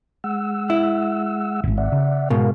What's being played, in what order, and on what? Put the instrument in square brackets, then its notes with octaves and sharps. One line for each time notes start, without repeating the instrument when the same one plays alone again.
[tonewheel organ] G#3 F#5 E6
[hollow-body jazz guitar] E4
[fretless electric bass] D#1 G#1
[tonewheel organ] D5 E5 F#5
[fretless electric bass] C#3
[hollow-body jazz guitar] G#2 B2 [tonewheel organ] A#4 F5